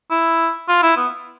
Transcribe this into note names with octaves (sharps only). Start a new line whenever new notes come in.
E4
F4
E4
B3